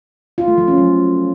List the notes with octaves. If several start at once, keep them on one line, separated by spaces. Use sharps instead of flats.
F4
A3
F3
C#4
F#3